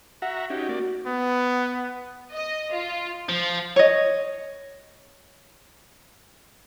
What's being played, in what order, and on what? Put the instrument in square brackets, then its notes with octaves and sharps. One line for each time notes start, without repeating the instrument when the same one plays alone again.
[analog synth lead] F#4 [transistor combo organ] E5 F#5 A#5
[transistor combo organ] C#4 D#4 G4
A#3 D5
[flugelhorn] B3
[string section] D#5
F4
[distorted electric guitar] F3
[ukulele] C#5 D#5